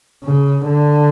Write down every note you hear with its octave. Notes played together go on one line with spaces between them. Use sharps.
C#3
D3